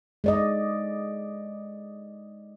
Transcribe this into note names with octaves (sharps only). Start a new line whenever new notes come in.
G#3 D5 D#5